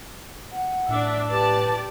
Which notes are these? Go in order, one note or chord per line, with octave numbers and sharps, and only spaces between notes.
F#5
A2 D4 E5
G4 B4 D5 A5